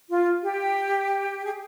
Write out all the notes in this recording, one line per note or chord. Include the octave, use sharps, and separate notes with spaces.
F4
G4
G#4